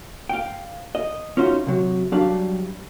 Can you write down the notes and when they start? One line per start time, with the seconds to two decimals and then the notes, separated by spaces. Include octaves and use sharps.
0.29 F5 G5
0.95 D#5
1.37 C#4 D#4 F4 F#4 E5
1.67 C3 F#3
2.12 F#3 G3 D4 F5 B5